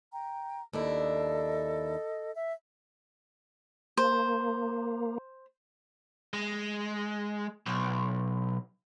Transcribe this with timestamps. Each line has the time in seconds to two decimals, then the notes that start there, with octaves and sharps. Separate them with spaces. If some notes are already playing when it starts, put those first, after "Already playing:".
0.12 G5 A#5
0.73 D#2 D4 E4 A4 D#5
2.36 E5
3.97 A#3 C5
6.33 G#3
7.66 B1